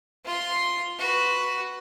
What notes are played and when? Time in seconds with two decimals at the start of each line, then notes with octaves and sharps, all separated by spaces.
0.25 F4 C6
0.98 F#4 B4